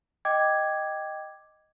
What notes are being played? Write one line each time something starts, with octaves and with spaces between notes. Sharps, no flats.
D#5 G5 D6 G#6